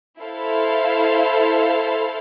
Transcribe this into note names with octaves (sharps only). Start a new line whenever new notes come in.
E4 A4 C5 F5